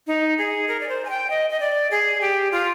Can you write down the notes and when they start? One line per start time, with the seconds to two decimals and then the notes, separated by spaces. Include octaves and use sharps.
0.07 D#4
0.38 G#4
0.68 A#4
0.80 D5
0.89 C5
1.05 G#5
1.10 G5
1.30 D#5
1.50 D#5
1.60 D5
1.91 G#4
2.21 G4
2.52 F4